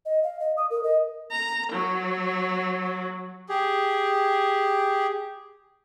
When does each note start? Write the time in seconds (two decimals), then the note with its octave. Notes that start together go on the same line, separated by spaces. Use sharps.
0.05 D#5
0.23 F5
0.40 D#5
0.57 D#6
0.71 A#4
0.83 D#5
1.31 A#5
1.72 F#3
3.49 G4 G#4